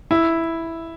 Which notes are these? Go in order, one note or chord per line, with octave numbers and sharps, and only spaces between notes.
E4